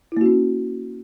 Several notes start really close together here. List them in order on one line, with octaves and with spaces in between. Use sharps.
E4 A#3 F#4 C#4